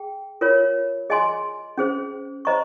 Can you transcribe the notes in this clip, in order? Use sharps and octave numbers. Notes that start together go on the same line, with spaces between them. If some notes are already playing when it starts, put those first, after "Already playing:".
Already playing: G#4 G5
F4 A#4 C#5
G#4 D#5 G#5 C6
C#4 G#4 C5
C5 D#5 A#5 C#6